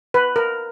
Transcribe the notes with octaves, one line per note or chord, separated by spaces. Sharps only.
B4
A#4